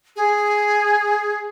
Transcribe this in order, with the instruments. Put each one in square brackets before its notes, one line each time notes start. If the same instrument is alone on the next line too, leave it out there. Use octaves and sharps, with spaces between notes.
[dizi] G#4